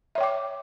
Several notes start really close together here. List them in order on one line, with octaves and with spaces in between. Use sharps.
E5 C#5 G5 D6